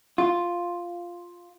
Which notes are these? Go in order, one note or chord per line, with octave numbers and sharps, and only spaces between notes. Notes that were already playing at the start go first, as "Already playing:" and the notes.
F4